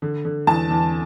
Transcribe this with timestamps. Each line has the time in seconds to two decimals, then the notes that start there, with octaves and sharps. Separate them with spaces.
0.02 D3
0.25 D3
0.47 E2 A5
0.70 E2